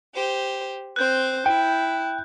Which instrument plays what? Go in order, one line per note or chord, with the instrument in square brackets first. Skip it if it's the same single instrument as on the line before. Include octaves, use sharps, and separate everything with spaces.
[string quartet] G4 C5
[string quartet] C4 C5 [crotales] F#6 G6
[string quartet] E4 [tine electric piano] G5